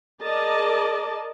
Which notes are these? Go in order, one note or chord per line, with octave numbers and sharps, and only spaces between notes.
G#4 A#4 D5 D#5 A5